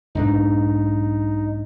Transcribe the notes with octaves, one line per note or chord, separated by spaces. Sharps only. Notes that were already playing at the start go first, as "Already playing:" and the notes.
B1 G#2 D4 D#4